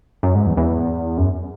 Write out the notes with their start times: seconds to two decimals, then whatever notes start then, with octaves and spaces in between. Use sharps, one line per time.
0.23 F#2
0.35 G#2
0.47 E2
0.57 E2
1.18 F#2